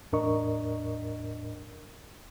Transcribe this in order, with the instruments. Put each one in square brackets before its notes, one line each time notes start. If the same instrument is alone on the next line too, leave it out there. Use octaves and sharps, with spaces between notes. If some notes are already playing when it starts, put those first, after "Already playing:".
[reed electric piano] E2 A2 D4 A#4 D#5 C#6